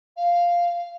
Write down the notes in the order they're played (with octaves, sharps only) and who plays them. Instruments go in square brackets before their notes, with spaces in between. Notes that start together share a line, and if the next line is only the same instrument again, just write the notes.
[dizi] F5